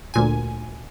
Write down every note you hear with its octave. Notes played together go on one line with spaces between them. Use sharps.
D2 A#2 G#5